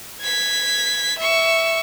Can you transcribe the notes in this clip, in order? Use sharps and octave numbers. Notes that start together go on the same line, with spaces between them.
G#6 B6
E5 C#6